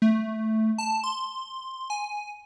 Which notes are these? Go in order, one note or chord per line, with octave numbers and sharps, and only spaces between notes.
A3
A5
C6
G#5